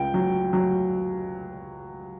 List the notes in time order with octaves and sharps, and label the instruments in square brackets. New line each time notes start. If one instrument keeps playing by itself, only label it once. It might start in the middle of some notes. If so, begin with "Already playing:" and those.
Already playing: [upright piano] C#2 G5
F#3
F#3